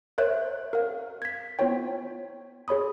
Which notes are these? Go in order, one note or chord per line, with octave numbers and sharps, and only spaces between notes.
A#4 C5 C#5 E5 F#6
A#4 F5
G#6 B6
B3 E4 F4 C5 C#5 G5
G#4 C#5 B5 D#6